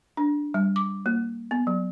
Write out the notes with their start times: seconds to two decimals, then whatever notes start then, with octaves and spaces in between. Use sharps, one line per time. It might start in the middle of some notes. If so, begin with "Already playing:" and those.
0.17 D4
0.54 G3
0.76 D6
1.06 A#3
1.51 B3
1.67 F#3